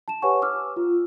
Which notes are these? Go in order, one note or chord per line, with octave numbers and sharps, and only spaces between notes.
A5 E7
G4 B4 C#5 F#5 G#5 C#6
D6 E6 F6
F4